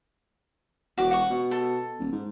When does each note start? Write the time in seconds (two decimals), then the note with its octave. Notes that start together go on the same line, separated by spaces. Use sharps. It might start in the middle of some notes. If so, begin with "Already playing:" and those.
0.98 E1 F#4 D6
1.11 F#5 C#6
1.30 B2
1.51 A4
1.99 D#1
2.12 G#2